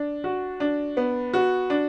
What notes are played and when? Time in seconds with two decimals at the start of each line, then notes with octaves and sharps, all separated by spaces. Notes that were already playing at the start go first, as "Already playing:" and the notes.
Already playing: D4
0.24 F#4
0.60 D4
0.97 B3
1.33 F#4
1.70 D4